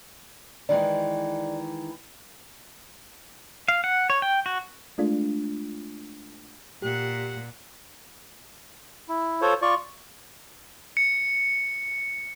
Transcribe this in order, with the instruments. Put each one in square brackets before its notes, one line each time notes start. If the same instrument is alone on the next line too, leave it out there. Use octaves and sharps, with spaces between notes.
[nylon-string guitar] D#3 E3 G#3 [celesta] D5
[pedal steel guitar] F5
F#5
C#5
G5
F#4
[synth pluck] G#3 A3 D4 F4
[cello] A#2 [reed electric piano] G4 [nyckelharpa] F#5
[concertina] E4
F4 A4 C5 C#5
F4 D5 C#6
[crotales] C#7